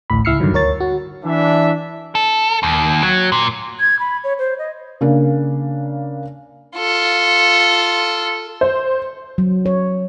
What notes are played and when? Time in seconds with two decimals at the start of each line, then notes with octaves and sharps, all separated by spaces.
0.10 A1 D2 A2 B5
0.25 C#2 E4 E6 F6 C7 C#7
0.40 G2 D3 D#3 F#3
0.53 D2 A#4 C#5 A6
0.80 F#4
1.24 E3 D4 E5
2.15 A4
2.63 D#2
3.02 F#3
3.32 A#2
3.80 G#6
3.99 B5
4.24 C#5
4.39 C5
4.59 D#5
5.01 C#3 A#3 D4
6.78 F4 A4
8.61 C5
9.38 F#3
9.66 C#5